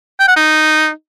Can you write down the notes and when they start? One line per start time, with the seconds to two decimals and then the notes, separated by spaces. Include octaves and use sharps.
0.20 G5
0.28 F#5
0.36 D#4